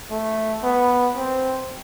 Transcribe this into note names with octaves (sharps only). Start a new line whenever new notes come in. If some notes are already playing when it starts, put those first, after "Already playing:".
A3
B3
C4